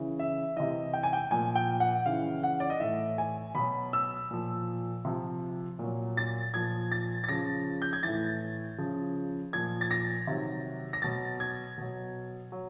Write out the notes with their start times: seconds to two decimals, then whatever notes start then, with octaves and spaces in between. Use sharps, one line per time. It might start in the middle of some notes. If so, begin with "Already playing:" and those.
Already playing: C#3 E3
0.19 E5
0.56 C3 E3 D#5
0.94 G5
1.03 G#5
1.13 G5
1.31 A#2 F3 G#5
1.56 G5
1.80 F#5
2.06 C#3 E3 F5
2.43 F#5
2.60 D5
2.70 D#5
2.80 A2 E3 E5
3.18 G#5
3.55 B2 F#3 B5
3.93 E6
4.31 A#2 F3
5.05 C3 F3
5.79 A#2 F#3
6.17 A6
6.54 A#2 F3 G#6
6.92 A6
7.24 A6
7.29 C#3 F3 A#6
7.82 G6
7.93 G#6
8.03 A2 E3 A6
8.78 C#3 F3
9.53 A#2 F3 G#6
9.81 A6
9.91 A#6
10.27 C3 D#3 F#3
10.93 A#6
11.02 B2 F#3 A6
11.40 G#6
11.78 B2 F#3
12.52 F#3